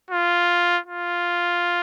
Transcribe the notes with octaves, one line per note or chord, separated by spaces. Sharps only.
F4
F4